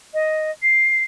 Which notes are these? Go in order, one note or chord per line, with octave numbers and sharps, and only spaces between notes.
D#5
C7